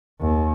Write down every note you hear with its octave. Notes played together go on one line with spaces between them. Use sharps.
D#2